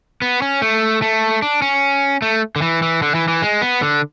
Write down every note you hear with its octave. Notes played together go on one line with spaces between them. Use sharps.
B3
C#4
A3
A3
D4
C#4
A3
D3
E3
E3
D3
E3
E3
G#3
B3
D3